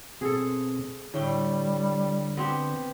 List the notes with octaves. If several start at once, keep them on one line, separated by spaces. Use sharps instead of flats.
B2 C4 G#4 A4
A2 D3 G3 A3 G5
B3 C4 G4